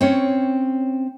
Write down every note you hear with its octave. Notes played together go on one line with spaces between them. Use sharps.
C4 C#4 C#5